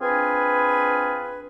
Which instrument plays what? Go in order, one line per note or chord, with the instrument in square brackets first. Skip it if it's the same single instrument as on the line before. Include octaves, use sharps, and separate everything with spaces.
[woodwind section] C4 D4 F4 G#4 B4